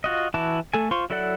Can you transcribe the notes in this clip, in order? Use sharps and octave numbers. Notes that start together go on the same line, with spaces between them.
F4 F#4 D#5
E3 E4 F#4 A5 D6
A3 A4 G#5
F4 C5 C6 C#6
F#3 E4 A4 D5 F#5